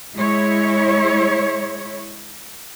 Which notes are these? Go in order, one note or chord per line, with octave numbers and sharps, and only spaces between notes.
G#3 E4 C#5